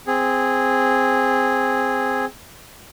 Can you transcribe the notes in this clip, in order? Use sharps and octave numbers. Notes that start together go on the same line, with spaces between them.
C4 G#4